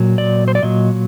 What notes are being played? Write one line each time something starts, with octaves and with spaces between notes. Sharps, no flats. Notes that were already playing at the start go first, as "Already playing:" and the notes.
Already playing: A#2 F#3
D5
C5
D5
A#2 F#3 D#5